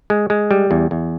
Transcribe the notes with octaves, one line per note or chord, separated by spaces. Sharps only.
G#3
G#3
G3
E2
E2